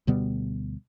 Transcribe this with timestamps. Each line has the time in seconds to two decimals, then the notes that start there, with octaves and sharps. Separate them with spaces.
0.07 D2 B2 G3 B3